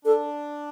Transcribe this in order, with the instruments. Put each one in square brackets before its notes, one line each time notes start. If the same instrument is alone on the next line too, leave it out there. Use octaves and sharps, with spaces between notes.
[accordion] D4 [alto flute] A4